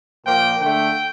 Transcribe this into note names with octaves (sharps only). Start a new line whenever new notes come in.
A#2 F3 A#3 G5
D3 A3 G5